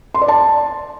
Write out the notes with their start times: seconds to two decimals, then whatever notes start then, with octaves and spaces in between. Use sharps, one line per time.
0.15 C6
0.21 D5
0.28 A5